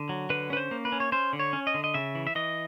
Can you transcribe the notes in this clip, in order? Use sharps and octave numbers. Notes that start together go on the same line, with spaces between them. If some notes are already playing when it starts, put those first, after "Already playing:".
Already playing: D3
F#3
D3 B4
C#4 B4
C5
A#3
B4
C#4
C#5
C#4 C5
D3
C#5
C#4
D#5
D3
D#5
C#3 E5
E3
E5
E3 D#5